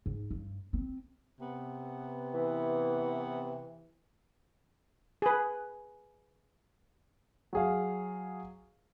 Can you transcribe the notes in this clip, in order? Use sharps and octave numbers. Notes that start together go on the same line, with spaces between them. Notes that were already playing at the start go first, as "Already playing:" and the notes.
G#2
G2
C4
C3 B3
E3
G#4 B4
F#3 G#4 F5